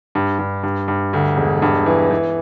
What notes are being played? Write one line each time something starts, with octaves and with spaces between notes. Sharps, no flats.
G2
G2
G2
G2
D2
E1
G2
E3
E3